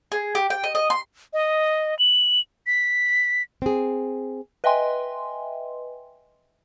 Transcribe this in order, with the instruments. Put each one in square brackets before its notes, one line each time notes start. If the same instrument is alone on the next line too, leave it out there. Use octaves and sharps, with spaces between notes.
[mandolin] G#4
G4
G5
D#5
D#5
C6
[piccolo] D#5
F#7
B6
[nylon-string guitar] C4 G#4
[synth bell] B4 D#5 E5 G5 G#5 C6